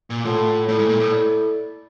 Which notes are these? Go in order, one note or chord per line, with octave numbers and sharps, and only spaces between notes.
A#2
A2 F4 A4 C#5 F#5 A5
A2 E4 A4 D5
G#2
A#2
A2
E4 A4 D5